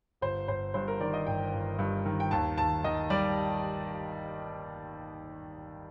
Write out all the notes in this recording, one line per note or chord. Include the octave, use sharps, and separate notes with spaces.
G1 C5
G1 C5
G2 C5
A#4
D#3 D5
D#5
G1 G5
G1
G2
D#3
G5
D#2 A5
D#2 A5
D#3 D#5
G3 D5